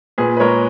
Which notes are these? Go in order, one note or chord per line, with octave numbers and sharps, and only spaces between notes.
A#2 G#4 B4
B4
G#3 A#4 C#5